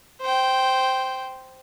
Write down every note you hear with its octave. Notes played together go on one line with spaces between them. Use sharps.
C5 G5